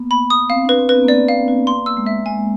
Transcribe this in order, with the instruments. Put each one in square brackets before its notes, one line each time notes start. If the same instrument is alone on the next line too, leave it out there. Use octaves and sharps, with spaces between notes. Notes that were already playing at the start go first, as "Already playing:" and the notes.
Already playing: [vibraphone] A#3 B3
[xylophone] B5
D#6
[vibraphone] C4 [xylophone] F5
[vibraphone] D4 [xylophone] B4
[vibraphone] C4
[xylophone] B4
[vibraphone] B3
A#3
[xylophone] D5
[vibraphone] B3
[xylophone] F5
B4
[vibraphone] A#3 [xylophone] C6
[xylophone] E6
[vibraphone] G#3
[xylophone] E5
[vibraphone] G#3 [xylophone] G#5